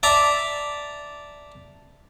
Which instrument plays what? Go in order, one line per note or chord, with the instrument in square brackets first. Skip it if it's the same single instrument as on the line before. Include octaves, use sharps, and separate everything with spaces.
[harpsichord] D5 E5 A5 A#5 D6